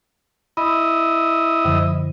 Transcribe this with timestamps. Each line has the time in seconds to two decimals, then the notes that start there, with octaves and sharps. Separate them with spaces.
0.57 E4 D#5 B5
1.65 F#2 D3 F3